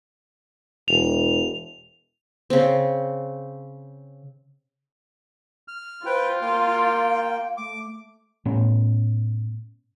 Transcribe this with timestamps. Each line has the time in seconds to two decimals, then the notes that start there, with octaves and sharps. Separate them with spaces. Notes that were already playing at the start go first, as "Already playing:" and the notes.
0.88 E1 F7
2.50 C#3 C4
5.68 F6
6.06 F4 B4 C5 G5
6.42 A#3 F5 G5
7.57 A3 D6
8.45 A2 B3 C#4